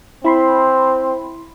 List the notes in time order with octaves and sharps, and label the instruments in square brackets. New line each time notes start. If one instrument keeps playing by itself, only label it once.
[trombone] C4 [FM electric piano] E4 B5 C6